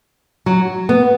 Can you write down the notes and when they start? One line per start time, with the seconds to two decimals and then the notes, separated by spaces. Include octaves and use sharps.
0.46 F#3
0.89 B3